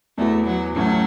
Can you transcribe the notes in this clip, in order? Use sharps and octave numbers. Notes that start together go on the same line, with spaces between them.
E2 E3 A3 B3 F#4 B4
F#3
A1 A2 F#3 A3 C#4